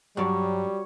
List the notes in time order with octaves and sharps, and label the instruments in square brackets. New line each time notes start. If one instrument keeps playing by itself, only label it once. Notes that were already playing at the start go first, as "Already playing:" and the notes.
[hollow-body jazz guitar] G2 D5 [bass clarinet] F#3 [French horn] G3 [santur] F#4 C#5